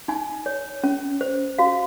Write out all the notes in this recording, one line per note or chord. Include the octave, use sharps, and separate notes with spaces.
D#4 G#5
C#5
C#4
C5
F#4 F5